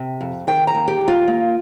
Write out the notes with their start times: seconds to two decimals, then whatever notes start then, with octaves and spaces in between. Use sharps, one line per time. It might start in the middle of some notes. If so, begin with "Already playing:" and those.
Already playing: C3
0.21 F2
0.47 D#3 G5
0.67 A#5
0.75 D#2
0.88 G4
1.01 D#2
1.08 F4
1.28 A#3